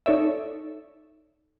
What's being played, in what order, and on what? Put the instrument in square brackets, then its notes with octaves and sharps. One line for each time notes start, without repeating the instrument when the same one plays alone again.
[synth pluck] D#4 A4 C#5 D5 E5